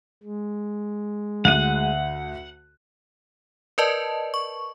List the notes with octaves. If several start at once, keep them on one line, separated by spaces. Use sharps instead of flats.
G#3
D2 F#5 F#6 D#7
A#4 B4 D5 D#5 A5
C#6